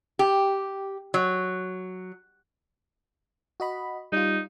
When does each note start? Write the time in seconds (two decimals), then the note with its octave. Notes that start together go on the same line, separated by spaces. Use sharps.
0.19 G4
1.14 F#3
3.60 F#4 D#5 B5
4.12 G3 D#4 F4